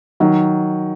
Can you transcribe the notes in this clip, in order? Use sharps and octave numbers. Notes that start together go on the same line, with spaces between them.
D#3 F#3